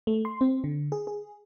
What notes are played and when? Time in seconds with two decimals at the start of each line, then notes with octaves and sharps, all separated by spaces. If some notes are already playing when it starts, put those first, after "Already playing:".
0.07 A3
0.25 C6
0.41 C4
0.64 D3
0.92 G#4
1.07 G#4